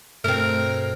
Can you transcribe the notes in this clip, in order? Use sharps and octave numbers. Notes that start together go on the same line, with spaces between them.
G2 B2 A3 C4 A#4